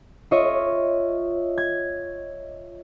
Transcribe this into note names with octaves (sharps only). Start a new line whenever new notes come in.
F4 C#5 D#5 E5
G#6